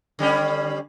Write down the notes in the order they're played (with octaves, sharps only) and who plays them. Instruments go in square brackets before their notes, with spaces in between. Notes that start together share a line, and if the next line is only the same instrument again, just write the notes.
[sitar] D3 G3 C#4